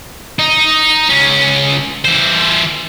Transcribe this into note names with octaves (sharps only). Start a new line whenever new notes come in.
D#4
C#2 C#4
E3 C5